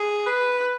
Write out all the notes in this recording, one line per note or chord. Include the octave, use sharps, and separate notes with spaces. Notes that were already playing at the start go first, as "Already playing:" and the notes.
Already playing: G#4
B4